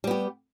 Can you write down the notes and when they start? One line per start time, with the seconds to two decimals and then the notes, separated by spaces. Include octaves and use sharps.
0.04 G3
0.07 B3
0.11 G4